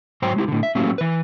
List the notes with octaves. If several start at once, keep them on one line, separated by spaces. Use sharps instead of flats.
G#2 F#3 C5 G5 A#5
G#3 E4 G4
A2 D3
E5
A2 F#3 A3 A#3 C#4 G4
E3 B4